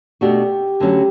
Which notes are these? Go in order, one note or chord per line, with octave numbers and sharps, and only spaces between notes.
B2 A3 D4 F#4 G4
D2 D3 F#3 C#4